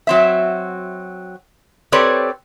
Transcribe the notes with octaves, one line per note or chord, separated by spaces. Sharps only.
F#3 C4 E5
C4 G4 A4 B4 C#5 D5